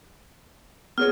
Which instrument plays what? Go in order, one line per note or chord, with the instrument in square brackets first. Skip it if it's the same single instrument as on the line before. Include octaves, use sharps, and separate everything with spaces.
[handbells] B3 G#4 C#5 [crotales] F6